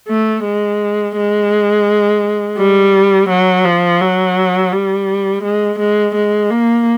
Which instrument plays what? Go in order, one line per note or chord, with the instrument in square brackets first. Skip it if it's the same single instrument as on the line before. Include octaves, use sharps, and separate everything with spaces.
[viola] A3
G#3
G#3
G3
F#3
F3
F#3
G3
G#3
G#3
G#3
A#3